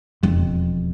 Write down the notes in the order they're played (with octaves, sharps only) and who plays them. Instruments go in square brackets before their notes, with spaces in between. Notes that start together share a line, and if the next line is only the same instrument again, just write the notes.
[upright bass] E1 F2